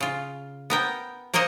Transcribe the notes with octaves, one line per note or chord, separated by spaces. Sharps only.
C#3 F4
B3 A#4 G5
A#3 A#4 C5 C#5 D#5